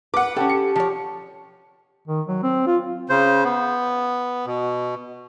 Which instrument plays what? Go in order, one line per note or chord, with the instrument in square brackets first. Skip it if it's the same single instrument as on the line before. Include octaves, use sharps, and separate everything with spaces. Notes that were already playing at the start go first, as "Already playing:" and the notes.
[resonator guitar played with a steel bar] B4 [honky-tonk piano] F#5 D6
[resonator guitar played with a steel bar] C#4 A4 [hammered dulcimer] G4
[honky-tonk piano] C#7
[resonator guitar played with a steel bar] F3 C#5
[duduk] D#3
F#3
C4
F4
[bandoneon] C#3 C5
B3
B2